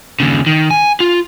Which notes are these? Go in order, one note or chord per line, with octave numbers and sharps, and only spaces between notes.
D#2 C#3
D#3
G#5
F4